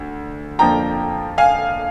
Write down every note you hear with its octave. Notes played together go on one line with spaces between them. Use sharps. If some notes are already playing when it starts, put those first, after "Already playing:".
Already playing: D2
F2 D3 F3 A#3 G5 A#5
F5 G#5